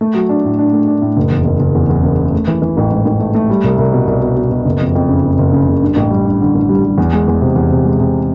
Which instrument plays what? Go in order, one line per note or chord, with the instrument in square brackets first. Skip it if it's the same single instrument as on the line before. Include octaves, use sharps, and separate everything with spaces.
[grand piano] A3
F#3
D4
A2
D4
A3
D4
A2
F#1
E2
F#1
F#1
E2
E2
F#1
C#3
A3
E3
E3
A1
G#2
A1
A3
A3
G3
C2
C2
B2
C2
B2
B2
B2
F#1
F2
F2
C#3
F#1
F#1
C#3
F#1
G2
A1
G3
G2
D3
A1
G3
G3
E2
G#3
E2
C3
E2
C3
G#3
C3